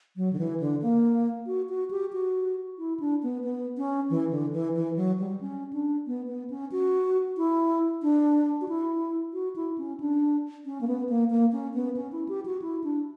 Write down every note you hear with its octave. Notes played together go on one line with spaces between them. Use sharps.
F#3
D3
E3
D3
A#3
F#4
F#4
G4
F#4
E4
D4
B3
B3
C#4
E3
D3
E3
E3
F#3
G3
C#4
D4
B3
B3
C#4
F#4
E4
D4
F#4
E4
F#4
E4
C#4
D4
C#4
A#3
B3
A#3
A#3
C#4
B3
C#4
E4
G4
F#4
E4
D4